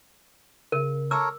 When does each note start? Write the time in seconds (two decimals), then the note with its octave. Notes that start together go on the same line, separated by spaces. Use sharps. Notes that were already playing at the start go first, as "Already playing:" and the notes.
0.72 C#3 A#4
1.11 A4 A#4 C#5 D6 E6